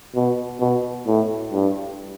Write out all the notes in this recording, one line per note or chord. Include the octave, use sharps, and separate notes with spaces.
B2
B2
A2
G2